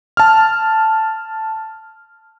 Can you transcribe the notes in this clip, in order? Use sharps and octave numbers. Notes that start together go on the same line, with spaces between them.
A5 F6